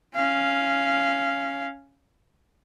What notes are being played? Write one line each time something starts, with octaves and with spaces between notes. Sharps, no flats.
C#4 F5